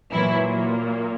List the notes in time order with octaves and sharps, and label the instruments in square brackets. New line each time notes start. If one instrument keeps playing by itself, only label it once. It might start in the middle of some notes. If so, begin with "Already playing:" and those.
[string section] A#2 E3 F#3 A#3 E4